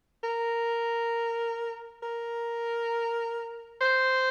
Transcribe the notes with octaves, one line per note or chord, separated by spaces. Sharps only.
A#4
A#4
C5